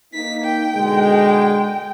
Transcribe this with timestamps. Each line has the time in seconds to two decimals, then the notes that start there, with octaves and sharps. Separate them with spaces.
0.14 A#3 D#4 B6
0.44 G5
0.75 B2 D3 G#3